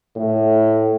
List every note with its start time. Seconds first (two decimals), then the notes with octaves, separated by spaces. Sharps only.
0.16 A2